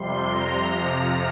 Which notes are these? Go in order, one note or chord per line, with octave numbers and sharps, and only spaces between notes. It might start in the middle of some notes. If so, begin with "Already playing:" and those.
Already playing: F2 C3 G3 C6
A#5
F2 C3 F3 A#5